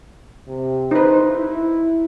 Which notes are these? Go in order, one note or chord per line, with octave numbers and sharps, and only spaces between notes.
C3
D#4 B4 C5
E4